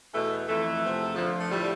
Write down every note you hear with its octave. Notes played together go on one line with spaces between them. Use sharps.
E2 B2 A3
F2 E3 A3
E2 C3 F3
F2 D3 F3
A3
A2 F3 G3